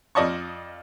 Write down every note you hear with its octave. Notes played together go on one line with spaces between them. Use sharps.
F2 F4 D5 D#5 A5 C#6